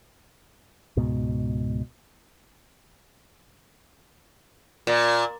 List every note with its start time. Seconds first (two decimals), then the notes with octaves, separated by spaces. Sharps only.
0.97 C#2 G#2 B2
4.87 A#2